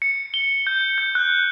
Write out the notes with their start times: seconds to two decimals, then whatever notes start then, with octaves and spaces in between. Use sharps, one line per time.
0.02 C#7
0.34 G7
0.67 G6
0.98 G6
1.15 F#6